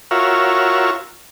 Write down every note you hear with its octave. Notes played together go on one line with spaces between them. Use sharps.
F4 F#4 A#4 C#5 E5